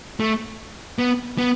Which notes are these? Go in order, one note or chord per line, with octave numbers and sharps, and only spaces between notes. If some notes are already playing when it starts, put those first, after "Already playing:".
A3
B3
B3